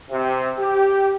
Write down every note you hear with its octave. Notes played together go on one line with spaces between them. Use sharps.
C3
G4